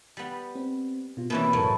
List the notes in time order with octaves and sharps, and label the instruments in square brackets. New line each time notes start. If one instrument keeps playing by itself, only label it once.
[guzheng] G3 B3
[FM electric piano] C4
B2 F4
[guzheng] B2 E3 G3 [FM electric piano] A#3 C4 [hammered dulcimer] B4 C#5
[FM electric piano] C2 F#2 A#4 [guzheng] A2 [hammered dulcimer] F#3 B4